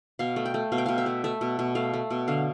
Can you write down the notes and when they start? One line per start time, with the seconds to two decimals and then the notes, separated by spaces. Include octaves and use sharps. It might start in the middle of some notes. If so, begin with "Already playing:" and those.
0.19 B2 F5
0.36 A3
0.46 G5
0.54 A3
0.72 B2 F5
0.78 G5
0.86 B2 F5
0.98 E5
1.06 A3
1.24 A3 E5
1.41 B2
1.59 B2
1.75 A3 F5
1.94 A3
2.11 B2
2.28 D3 F5